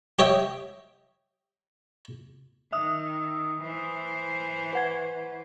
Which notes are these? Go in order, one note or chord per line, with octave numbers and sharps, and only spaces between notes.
G4 C#5 D#5 E5 G5
D#3 E5 D#6 E6
E3 C5
B4 F#5 G#6